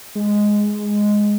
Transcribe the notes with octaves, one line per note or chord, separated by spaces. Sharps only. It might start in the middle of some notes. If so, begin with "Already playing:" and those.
G#3